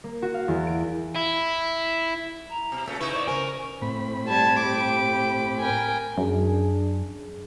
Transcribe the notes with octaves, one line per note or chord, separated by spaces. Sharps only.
A#3
F#4
F5
E2
D7
E4
A#5
B2
A#2 C#3 A3
C#3 D#4 E4 B4 C#6
C5 D5 C#6
C#3 B3 A#4 C5 G#5 C#6
A2 C4 B5
G3 A5 G#6
G4 D6
A#4 G5 G#5
F#2 D4 G#4